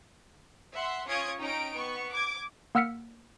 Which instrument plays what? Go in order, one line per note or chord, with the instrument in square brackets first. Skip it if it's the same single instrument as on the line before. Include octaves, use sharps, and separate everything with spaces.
[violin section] E5 F#5 C6
C#4 F4 C#6 D#6 G#6 D7
C#4 D#4 G5 A#5 D7
B3 C#6
D6 G#6
[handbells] A#3 F#5 E6 F6 B6 C#7